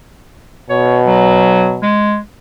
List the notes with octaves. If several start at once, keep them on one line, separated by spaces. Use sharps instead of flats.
B2 C#5
F#3
G#3